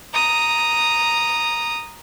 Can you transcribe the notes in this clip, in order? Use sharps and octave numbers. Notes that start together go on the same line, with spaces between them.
A#5 D#6